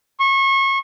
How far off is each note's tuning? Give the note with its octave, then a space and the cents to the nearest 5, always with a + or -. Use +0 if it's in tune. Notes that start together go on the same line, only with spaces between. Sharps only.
C#6 -30